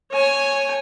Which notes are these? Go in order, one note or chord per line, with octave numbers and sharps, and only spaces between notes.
C#5 G#5